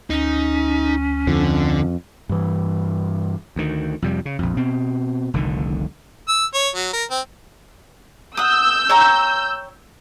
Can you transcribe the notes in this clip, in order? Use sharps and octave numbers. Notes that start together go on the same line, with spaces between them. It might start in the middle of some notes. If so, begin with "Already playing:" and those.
D2 C#4 D#4
F2 D3
G2 E3
D2 D#3
F2 C3 G3
C#3
A#1 F2
B2 C4
F1 C2 D3 D#3
E6
C#5
F#3
A#4
C4
F#5 D#6 E6 G6
C#5 G5 A#5